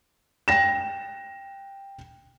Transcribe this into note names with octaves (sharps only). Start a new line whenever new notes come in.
G5 A#6 E7